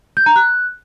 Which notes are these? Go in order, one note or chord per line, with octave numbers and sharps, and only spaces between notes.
G6
A#5
F#6